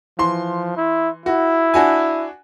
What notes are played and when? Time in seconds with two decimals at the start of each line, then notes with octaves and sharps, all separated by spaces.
0.19 E3 F3 C6
0.77 E4
1.26 E4 F#4
1.74 D4 F#4 G#5